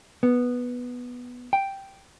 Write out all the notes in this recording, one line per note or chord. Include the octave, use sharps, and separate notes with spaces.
B3
G5